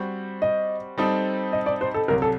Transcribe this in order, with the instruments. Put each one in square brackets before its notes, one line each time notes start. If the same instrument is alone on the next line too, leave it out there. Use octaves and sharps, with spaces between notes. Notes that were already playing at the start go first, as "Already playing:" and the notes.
Already playing: [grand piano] G3 C4 F#4 C5
[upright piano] D#5
[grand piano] G3 C4 D#4 A4
[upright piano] D#5
D5
C5
A4
[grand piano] C2 C3 F#3 [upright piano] A#4
[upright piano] A4